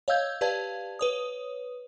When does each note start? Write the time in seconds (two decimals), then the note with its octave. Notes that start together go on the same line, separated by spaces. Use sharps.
0.08 C#5 D#5 F5 E6 G6 G#6
0.41 G4 B4 D5 F5 A5 G#6
0.99 B4 C#5 D#6